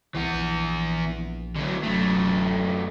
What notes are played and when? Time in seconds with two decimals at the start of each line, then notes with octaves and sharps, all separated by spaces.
0.15 C2 E3 B3
0.31 A#1
1.56 D3 F#3
1.83 D1 F#2 A3